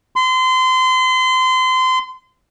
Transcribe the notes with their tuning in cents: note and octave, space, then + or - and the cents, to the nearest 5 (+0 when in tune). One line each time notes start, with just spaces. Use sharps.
C6 -30